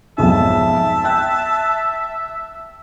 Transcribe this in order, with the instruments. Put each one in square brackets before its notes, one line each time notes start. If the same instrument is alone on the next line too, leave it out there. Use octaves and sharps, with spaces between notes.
[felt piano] B1 F2 G#2 [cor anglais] E5 [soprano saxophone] A5
[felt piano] G5 F#6